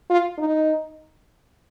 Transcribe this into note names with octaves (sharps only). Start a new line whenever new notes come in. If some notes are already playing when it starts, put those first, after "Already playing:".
F4
D#4